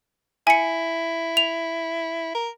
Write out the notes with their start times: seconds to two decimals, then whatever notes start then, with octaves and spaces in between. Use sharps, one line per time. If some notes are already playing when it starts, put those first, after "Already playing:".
0.47 E4 G#5 C#7
1.37 F7
2.35 A#4